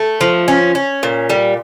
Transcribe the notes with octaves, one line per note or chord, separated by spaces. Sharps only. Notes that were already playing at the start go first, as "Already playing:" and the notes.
Already playing: A3
F3
C#4
C#4
A#2
G3